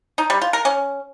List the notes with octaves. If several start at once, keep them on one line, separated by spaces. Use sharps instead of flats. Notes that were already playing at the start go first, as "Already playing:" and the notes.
D#4
G3
F4
A#4
C#4